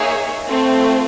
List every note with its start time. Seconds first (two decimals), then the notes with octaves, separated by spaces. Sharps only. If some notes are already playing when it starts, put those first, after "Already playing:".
Already playing: A#3 D#4 G#4 C#5 E5
0.48 A3 C4 F4